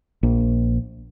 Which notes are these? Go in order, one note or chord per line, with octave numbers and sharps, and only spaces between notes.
A#1